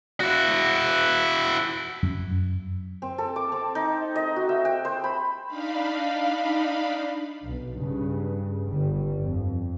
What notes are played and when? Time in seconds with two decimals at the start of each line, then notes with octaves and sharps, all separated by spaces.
0.20 E4 F#4
2.03 F#2
3.02 C4
3.18 A4
3.36 D6
3.52 C4
3.75 D#4
4.16 D#5
4.36 F#4
4.49 E5
4.65 G5
4.85 C5
5.04 B5
5.47 D4 D#4 F5 B5
7.44 B1
7.76 G2 C#3
8.67 G1 G3
9.22 F2